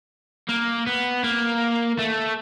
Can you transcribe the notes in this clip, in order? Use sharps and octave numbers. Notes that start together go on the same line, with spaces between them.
A#3
B3
A#3
A3